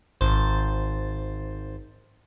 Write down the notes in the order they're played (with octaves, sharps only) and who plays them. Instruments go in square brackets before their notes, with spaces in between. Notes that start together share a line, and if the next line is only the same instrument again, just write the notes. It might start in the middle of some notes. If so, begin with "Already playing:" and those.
[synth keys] G#1 C5 A6